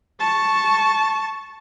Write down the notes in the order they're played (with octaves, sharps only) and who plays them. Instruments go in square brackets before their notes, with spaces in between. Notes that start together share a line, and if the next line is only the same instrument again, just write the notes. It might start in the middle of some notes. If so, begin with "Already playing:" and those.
[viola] A5 C#6